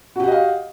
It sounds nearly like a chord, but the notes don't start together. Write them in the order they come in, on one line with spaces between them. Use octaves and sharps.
F#4 G4 F#5 D#5 F5